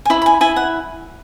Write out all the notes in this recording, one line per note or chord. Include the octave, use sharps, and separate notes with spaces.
G#5
E4 B5
B5
G#5
E4 G#5
F#5